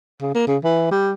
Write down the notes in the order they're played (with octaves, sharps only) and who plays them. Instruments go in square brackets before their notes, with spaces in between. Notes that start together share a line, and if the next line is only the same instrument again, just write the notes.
[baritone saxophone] C#3
A#3
C#3
E3
G3